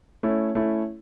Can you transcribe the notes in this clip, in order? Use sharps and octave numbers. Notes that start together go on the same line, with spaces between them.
A3 C#4 E4
A3 C#4 E4